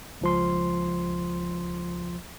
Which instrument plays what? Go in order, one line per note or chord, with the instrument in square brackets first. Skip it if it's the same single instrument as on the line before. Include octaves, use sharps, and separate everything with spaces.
[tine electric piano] C#2 F3 C6